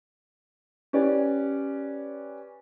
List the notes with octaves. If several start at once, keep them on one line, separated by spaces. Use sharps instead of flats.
C#4 G4 B4 D5